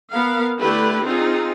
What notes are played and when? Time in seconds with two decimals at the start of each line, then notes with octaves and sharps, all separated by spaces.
0.11 B3 A#4 F5
0.60 D3 A3 E4 G4 B4
1.05 C4 D#4 F4 G#4